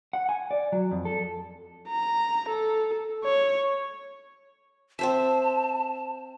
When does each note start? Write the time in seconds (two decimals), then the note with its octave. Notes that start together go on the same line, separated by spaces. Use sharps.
0.13 F#5
0.29 G#5
0.51 D5
0.72 F#3
0.91 F2
1.05 A4
1.89 A#5
2.49 A4
3.24 C#5
4.99 C4 C5 E5 A5